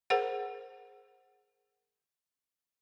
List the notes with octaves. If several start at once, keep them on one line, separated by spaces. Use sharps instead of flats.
G#4 A#4 C5 F#5